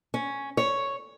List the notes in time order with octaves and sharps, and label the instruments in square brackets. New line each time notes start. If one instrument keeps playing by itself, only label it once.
[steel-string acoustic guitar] C#4
C#5